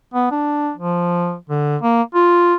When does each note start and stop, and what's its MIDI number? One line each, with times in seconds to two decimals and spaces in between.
0.14 0.27 59
0.31 0.71 62
0.77 1.36 53
1.49 1.77 50
1.82 2.02 58
2.14 2.55 65